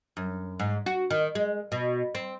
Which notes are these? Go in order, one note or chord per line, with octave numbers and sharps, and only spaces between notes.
F#2
G#2
F#4
D#3
G#3
B2
C4